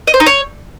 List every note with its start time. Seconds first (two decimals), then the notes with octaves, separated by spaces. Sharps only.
0.07 D#5
0.14 C5
0.20 D#4
0.26 C#5